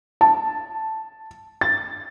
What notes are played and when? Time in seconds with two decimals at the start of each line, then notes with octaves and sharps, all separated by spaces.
0.21 A5
1.61 A6